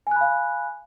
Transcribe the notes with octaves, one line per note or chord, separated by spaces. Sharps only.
F5 G#5 B5 F#6